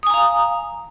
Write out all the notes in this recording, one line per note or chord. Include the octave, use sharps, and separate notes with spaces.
F5 G#5 A#5 D#6